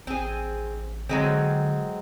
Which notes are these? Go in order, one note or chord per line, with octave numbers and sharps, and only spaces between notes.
A1 C4 G#4
D3 F#3 G#3 C4